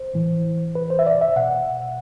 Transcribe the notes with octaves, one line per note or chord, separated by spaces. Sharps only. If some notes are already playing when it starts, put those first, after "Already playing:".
Already playing: C5
A2 E3
B4
C5
E5
D5
E5
B2 F#5